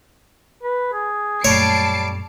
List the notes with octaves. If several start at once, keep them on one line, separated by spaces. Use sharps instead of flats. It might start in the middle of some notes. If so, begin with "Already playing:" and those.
B4
G#4
F#2 A#2 G3 A3 C#5 A5 C7 D7